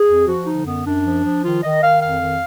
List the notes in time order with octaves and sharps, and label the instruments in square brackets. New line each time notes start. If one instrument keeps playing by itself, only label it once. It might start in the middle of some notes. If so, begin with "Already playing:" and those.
Already playing: [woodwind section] G#4
F2
F3 F#4
D3 D#4
F#2 B3
F#2 D4
F3
F3
D#3 F4
D#3 D#5
D#3 F5
F2 F5
D#3